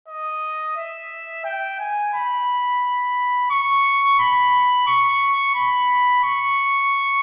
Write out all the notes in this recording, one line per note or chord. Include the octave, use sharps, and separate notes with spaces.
D#5
E5
G5
G#5
B5
C#6
B5
C#6
B5
C#6